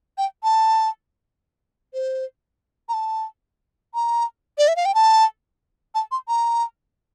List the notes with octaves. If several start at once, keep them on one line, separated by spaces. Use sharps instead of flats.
G5
A5
C5
A#5
A5
A#5
D5
E5
F5
G5
A5
A5
C6
A#5